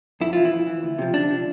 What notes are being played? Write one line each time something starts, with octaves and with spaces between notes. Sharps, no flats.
F2 E4
E3 F4
E4
F2
E3
D2
C3 F3
D2 D4
C3 F3